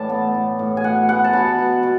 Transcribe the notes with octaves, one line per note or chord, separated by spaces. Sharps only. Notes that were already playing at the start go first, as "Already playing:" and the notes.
Already playing: A2 E3 D5 A5
B3
A2
A2
G#5
B2 F#5
B3 F#5
A5
B2 B5
B2
B2